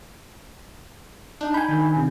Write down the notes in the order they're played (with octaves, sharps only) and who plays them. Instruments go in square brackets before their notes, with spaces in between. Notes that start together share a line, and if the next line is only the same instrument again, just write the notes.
[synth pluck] D4 D#4
[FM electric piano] G#5 B5 [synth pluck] G6
[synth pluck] D#3
[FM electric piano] C3